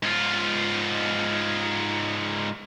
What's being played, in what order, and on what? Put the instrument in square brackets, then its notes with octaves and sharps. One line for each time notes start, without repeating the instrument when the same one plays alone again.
[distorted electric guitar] G#2 F4